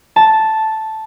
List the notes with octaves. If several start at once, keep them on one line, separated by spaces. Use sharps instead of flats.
A5